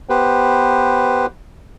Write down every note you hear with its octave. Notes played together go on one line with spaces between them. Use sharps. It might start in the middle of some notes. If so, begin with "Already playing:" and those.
B3 G4 B4 C5